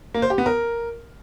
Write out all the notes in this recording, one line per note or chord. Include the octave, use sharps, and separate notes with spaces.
A#3
C5
G4
B3
A#4